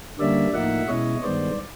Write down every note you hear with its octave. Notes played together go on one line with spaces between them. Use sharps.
D3 G3 A#3 C#4 D5 E5
A2 F3 A#3 D#4 E5 F#5
B2 G#3 C#4 E4 C#5 D#5
G2 D#3 G#3 B3 C5 D5